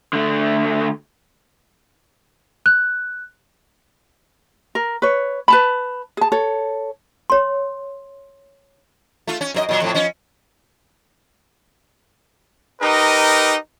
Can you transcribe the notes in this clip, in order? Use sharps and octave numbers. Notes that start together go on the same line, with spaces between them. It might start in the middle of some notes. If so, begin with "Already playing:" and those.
D3 A3
F#6
A#4
B4 C#5
B4 A5 B5
G#4 A5
A4 C#5
C#5 C6
A3 F4
C#4
F#2 B3 D#5
A#2 F#3
F2 A2
F3 C#4
D#4 G4 A#4 B4 D#5